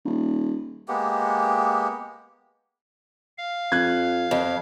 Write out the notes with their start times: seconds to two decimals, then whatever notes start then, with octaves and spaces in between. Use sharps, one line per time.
0.05 D#1
0.88 G#3 A#3 B3 G4
3.38 F5
3.72 F2 F#6 G#6
4.31 F2